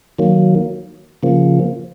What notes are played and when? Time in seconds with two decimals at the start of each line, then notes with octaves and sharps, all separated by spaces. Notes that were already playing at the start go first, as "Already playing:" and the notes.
0.19 D#3 F#3 A#3
1.23 C#3 F3 A#3